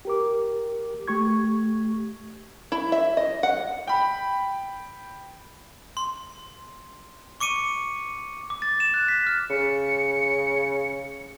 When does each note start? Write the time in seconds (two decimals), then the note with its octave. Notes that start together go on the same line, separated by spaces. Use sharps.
0.05 G4 A#4 D6
1.08 A3 G4 C#6 G#6
2.72 E4
2.92 E5
3.17 D#5
3.43 F#5
3.87 G5 B5
5.97 C6
7.40 C#6 D6 C#7 D#7
8.50 D6
8.62 A6
8.80 E7
8.94 F#6
9.08 B6
9.26 F6
9.50 C#3 C#7